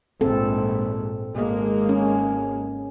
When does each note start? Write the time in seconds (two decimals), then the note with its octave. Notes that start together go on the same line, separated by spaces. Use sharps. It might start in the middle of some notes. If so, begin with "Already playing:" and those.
0.21 A#1 G#2 C4 A4
1.34 G#1 G#3 A#3
1.89 C#4